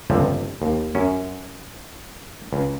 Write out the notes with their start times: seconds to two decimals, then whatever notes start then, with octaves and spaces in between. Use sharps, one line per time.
0.10 G1 C#2 C3 F3
0.62 D#2
0.95 F#2 C#4
2.53 C#2